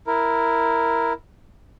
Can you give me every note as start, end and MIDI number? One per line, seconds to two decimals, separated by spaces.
0.07 1.13 64
0.07 1.13 70